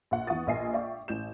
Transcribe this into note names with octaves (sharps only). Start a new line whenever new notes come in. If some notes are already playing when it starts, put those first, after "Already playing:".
A#1 F#5
E2 E3 F#5 C#6 D#6 A6
A#1 A#3 A#4 D#5 G#5 C7
D5 E5 F5 G5 C#6
A1 G6 E7